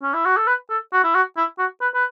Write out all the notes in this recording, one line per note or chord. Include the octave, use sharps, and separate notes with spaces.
C#4
E4
F#4
A4
B4
A4
F#4
E4
F#4
E4
F#4
B4
B4